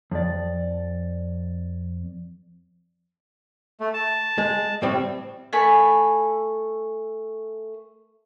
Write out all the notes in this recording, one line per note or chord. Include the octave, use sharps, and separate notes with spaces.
F2 D5
A3
A5
G#3
A2 G3 C4
A3 G#5 B5